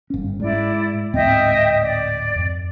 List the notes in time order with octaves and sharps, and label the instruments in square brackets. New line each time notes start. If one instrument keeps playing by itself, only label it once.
[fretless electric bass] G1 C#4
[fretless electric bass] G#2 [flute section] E4 D5
[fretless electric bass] D1 G#2 C4 [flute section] D#5 E5 G5
[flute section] D5
[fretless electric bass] F2